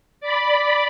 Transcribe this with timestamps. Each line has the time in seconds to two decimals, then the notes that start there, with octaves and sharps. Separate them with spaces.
0.21 D5 B5